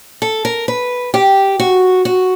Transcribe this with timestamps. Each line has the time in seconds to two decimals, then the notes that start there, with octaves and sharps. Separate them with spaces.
0.22 A4
0.45 A#4
0.68 B4
1.14 G4
1.60 F#4
2.05 F#4